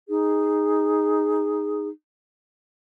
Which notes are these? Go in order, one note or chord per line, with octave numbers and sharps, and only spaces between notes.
D#4 G#4